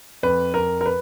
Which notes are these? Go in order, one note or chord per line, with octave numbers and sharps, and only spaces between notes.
F2 B4
F2 A#4
A#4
B4